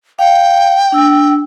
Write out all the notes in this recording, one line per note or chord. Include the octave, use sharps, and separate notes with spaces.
F5 G5
D4 E6